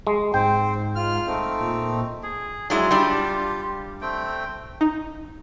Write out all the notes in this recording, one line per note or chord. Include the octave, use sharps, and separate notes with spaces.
G#3
G#2 C4 C5 G5
F4 F6
A3 C4 D#4
A#2
G#4
F#3 G#3 D#4 E4 D5
G3 D4 F4 G4
A3 C4 G5
D#4